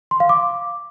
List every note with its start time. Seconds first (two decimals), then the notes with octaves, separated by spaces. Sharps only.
0.11 C6
0.20 F5
0.29 D6